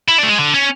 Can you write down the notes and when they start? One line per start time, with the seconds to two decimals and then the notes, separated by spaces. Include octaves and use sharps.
0.08 E4
0.19 D4
0.23 A3
0.29 G#3
0.38 D3
0.54 C#4